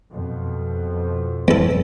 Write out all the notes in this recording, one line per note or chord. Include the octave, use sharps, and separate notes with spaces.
F2 B2
E2 A4